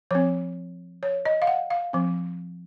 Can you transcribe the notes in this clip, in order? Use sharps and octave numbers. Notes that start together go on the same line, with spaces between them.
F3 C4 C#5
C#5
D#5
F5
F#5
F5
F3 C4